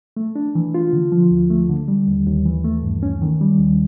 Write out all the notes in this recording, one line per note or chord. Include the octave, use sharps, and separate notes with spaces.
A3
D4
E3
F4
D3
F3
D2
A3
D3
G3
D#2
D#2
E3
A3
G2
C#4
D#3
G3
D#2